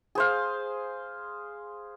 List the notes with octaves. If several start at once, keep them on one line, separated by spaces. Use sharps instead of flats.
G#4 C5 F5